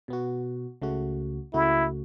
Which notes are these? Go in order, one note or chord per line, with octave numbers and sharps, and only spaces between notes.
B2 B3 F#4
C#2 C#3 A3 F#4
C#2 C#3 A3 E4 F#4